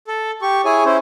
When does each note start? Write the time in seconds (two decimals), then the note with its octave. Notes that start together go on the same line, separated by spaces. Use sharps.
0.08 A4
0.42 G4 C#6
0.65 E4 G#4 C#5 G#5
0.85 C#4 E4 C5